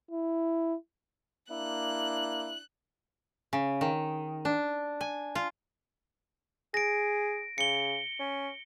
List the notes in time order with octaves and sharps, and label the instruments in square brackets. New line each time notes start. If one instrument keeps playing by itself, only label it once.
[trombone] E4
[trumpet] A#3 [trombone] D4 [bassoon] E4 [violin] F#6
[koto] C#3
D#3
D4
G#5
F4
[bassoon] G#4 [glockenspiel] A#6 D7
[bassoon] C#3 [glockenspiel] C#7 G7
[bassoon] C#4